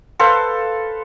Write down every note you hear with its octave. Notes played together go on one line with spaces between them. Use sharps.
A4 B4 C5 F5